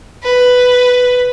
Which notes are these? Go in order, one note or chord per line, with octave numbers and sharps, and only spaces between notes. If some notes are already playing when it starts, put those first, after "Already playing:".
B4